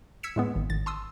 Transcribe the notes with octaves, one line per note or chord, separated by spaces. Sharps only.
E6 G#6 B6 C#7 E7
A2 G#3 B3
G#1
G#1 A6
A5 C6 D#6 E6